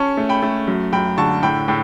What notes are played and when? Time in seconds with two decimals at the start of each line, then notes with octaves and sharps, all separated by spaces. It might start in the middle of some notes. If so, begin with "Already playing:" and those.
Already playing: C#4 A5 C#6
0.17 A3
0.29 G5 B5
0.43 A3
0.67 F#2
0.92 F#2 G5 B5
1.17 D3 A5 C#6
1.43 A2 G5 B5
1.68 A2 G5 B5